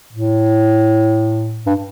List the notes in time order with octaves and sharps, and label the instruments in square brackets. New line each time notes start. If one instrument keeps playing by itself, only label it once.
[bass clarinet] A2
G2